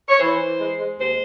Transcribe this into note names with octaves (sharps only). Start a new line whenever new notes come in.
C#5
E3 C5
E3
G#3
G#3
D#2 C5